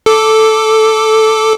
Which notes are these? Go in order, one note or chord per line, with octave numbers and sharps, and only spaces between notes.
A4 D6